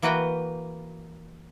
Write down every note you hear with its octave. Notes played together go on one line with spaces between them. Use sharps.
E3 A#3 F#4 B4 F#5 G5